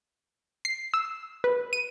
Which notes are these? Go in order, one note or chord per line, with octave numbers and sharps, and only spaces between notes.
C7
E6
B4
D#7